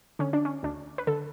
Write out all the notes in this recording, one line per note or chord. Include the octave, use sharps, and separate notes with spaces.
D3 C#4
D4
C#4
D2 D4
B4
D3 A4